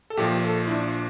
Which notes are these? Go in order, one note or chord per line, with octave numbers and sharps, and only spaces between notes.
A4
A#1 A#2 F3 G4
A4
E4
D4